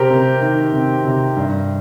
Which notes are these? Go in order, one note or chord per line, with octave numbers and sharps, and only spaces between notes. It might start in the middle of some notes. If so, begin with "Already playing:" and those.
Already playing: C3 C4 G4 A#4
C3
D#3
C3
C3
G2